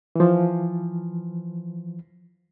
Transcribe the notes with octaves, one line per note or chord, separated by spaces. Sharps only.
E3 F3